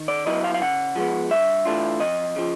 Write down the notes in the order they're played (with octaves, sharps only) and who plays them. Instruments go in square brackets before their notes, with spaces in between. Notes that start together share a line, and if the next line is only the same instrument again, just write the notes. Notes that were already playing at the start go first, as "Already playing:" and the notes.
Already playing: [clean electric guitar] D#3
D5
F#3 B3 E4 D#5
F5
F5
C#3 F#5
F3 G#3 B3
G2 E5
E3 A3 D4 F4
F2 D#5
C#3 F3